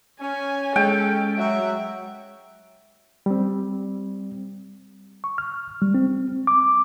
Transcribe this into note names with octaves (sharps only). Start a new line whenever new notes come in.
C#4 G#5
G#3 A4 G5
F#3 F#4 E5
G3 C4
C#6
F6
G3
C4
D6